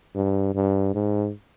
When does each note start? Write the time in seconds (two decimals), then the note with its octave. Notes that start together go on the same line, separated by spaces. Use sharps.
0.15 G2
0.55 G2
0.94 G#2